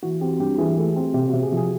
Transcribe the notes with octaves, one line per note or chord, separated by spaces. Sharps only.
E3 F#4
C4 G4
G2 G4
E3 G#4
A3
C4
C3 G4
C3 F#4
G#4
F3
G#4